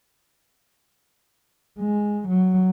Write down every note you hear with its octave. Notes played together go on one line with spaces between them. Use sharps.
G#3
F#3